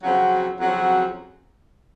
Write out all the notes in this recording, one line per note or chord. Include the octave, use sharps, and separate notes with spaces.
F2 C#3 F#3 C4 F#4
F2 C#3 F#3 C4 F#4